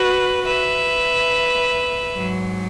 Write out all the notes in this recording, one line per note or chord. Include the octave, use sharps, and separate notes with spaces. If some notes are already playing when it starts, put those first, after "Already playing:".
Already playing: F#4 B4
B4 E5
G#2 F#3